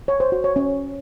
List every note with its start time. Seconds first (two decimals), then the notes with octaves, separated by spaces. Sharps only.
0.08 C#5
0.20 C5
0.32 F#4
0.44 C#5
0.56 C#4